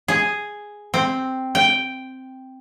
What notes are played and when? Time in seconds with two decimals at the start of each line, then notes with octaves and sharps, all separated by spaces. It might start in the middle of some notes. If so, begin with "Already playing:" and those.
0.08 G#4
0.94 C4
1.55 G5